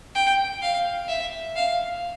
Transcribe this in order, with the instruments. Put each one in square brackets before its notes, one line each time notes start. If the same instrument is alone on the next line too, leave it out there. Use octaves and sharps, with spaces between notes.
[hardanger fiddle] G5
F5
E5
F5